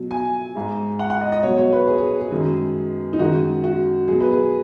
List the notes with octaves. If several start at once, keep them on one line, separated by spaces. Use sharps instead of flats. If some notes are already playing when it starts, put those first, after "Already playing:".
Already playing: B2 F#3
G#5
G#2 G#3
F#5
F#5
D#5
D#5
B2 F#3 C#5
C#5
B4
G#4
G#4
G#4
F#2 D#3 G#3
D#4
F#2 D#3 G#3 F#4
F#4
B2 F#3 G#4
B4
G#4